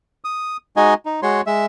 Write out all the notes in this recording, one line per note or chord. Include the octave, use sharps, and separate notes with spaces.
D#6
G#3 D#4 F#4 D#5 G#5
D#4
G#3 F#4 C#5 C6
G#3 E5